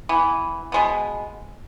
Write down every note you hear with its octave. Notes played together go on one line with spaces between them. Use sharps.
E3 B3
B2 G#3 B3